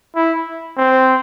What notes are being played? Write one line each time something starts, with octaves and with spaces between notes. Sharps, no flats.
E4
C4